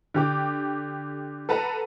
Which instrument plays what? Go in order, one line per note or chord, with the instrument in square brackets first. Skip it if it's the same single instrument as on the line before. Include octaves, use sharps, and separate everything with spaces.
[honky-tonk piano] D3 G4 D6
A4 B4 F#5 A5 A#5